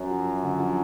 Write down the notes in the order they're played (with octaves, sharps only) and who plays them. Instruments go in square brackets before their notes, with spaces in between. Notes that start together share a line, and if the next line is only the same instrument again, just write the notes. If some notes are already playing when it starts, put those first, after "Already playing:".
Already playing: [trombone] F#2 [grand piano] F#3
[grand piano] F3
D3
F3